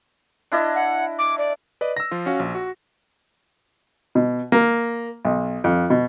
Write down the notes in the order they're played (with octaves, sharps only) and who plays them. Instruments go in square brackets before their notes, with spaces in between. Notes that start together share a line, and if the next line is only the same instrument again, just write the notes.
[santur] D4 E4 D#5
[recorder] F#5
D6
D5
[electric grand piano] B4 D5 D#5
E6 A#6
F3 F4
C#4 F#4 F5
A#1
F#4
[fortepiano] B2
A#3
B1
F2
B2